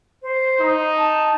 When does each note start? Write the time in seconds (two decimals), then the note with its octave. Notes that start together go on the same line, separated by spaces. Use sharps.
0.22 C5
0.60 D#4
0.97 A5